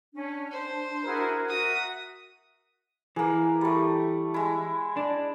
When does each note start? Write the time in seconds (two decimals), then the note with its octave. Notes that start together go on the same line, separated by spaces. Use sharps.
0.14 C#4 D4
0.51 C5 C6
1.05 E4 F#4 G#4 A#4
1.49 F#4 E5 D#6
3.16 E3 A#3 G#4
3.61 G3 A3
4.34 G#3 E4
4.97 D4